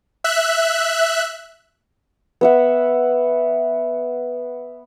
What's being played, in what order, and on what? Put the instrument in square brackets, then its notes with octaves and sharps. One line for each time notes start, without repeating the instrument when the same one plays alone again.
[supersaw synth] E5 F#6
[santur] B3 E5 F#5